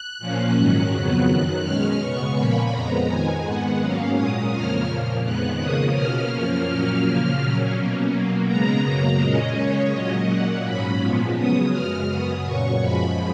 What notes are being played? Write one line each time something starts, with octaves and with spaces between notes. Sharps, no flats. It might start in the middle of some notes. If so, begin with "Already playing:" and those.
Already playing: F#6
A#2 F3 A#3 C#4
G#2 D#3 F#3 C#4
F2 C#3 F#3 B3 F#6
F#2 D#3 F#3
B2 G#3 C#4 F6
C#3 G#3 B3 C#6
A#2 F3 A#3 C#4 B5
F2 F3 G#3 B3 A#5
F2 D#3 G#3 G#5
G#2 D#3 G#3 B3 F#5
G#2 F#3 A#3 C#4 F5
A#2 G#3 C#4 D#6
F2 C#3 F3 A#3 C#4 F6
A#2 F3 A#3
F2 D#3 G#3 B3 F#6
C#3 F3 A#3 C#4 D#6
B2 A#3 C#4 F6
F#2 F3 A#3 C#4 F6
A#2 F#3 A#3 C#4
C#3 F3 A#3
A#2 F#3 C#4
B2 A#3 C#4
B2 F#3 A#3
C#3 G#3 B3 A#5
F#2 C#3 F#3 A#3
A#2 G#3 C#4 D#5
C#3 G#3 C#4 C#5
A#2 F#3 C#4 D#5
A#2 F#3 A#3 F#5
G#2 F#3 C#4 B5
A#2 F3 G#3 B3
C#3 F#3 B3 D#6
F#2 C#3 G#3 F6
F#2 C#3 F#3 B3 D#6
A#2 F#3 C#4 C#6
F#2 F3 G#3 B5